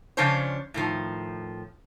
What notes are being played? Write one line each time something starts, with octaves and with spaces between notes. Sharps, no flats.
C#3 F3 C#4 D4 C5 C#5
A2 D#3 F3